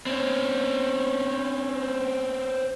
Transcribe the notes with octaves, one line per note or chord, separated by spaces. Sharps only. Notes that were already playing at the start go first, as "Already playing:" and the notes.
C4 C#4